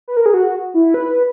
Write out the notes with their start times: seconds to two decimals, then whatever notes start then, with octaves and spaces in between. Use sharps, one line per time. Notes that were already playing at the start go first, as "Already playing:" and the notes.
0.08 B4
0.17 A#4
0.26 G#4
0.34 F#4
0.74 E4
0.94 B4